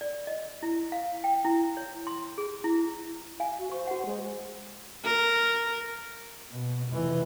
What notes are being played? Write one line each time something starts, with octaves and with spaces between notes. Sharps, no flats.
D5
D#5
E4
F5
G5
E4
C#5
C6
G#4
E4
F5 G#5
F#4
C5 C#6
F#4 F#5
G#3
A#4
B2
F1 E3